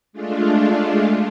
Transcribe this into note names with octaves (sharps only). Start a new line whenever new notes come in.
G#3 A3 D4 F4